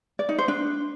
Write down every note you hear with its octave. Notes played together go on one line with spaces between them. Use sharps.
D5
D#4
C5
D4